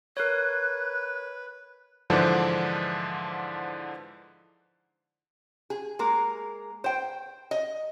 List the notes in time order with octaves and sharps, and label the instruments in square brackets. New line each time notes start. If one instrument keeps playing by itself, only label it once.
[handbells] A#4 C#5 [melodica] B4 [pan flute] F#6
[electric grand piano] G#2 D3 E3 F3 D4 C5
[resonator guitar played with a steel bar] G#4
G#3 A#3 A#4
C5 G5
D#5